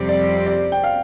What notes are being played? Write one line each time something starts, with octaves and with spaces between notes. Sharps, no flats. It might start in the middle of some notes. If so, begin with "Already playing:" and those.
Already playing: F2 C3 G3 C4 G4 C5
D5
D5
G5
F5